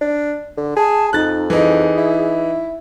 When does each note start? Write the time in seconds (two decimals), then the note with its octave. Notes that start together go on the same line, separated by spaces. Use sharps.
0.01 D4
0.57 D3
0.77 G#4 A5
1.13 F2 D#4 F#6 A6
1.50 E3 D#4 G#4
1.97 E4